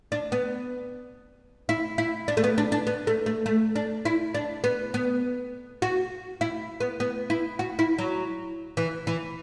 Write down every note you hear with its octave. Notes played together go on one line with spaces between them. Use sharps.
D4
B3
E4
E4
D4
A3
B3
D4
D4
B3
A3
A3
A3
D4
E4
D4
B3
B3
F#4
E4
B3
B3
E4
F#4
E4
F#3
E3
E3